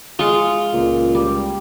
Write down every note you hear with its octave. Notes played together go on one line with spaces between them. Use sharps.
G#3 F4 C#6
C#2 A#2
G3